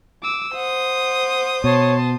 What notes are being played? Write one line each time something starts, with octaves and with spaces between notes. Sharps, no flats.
D6 E6
C5 F#5 D#6
B2 C#5 A5 C6